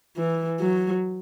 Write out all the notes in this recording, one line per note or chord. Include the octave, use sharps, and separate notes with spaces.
E3
F#3